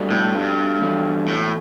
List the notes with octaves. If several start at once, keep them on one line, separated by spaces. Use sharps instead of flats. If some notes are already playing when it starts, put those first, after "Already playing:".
Already playing: G3 B3 D4 F#4 A4
A2
G2
E3 B3 F#4 A4
A2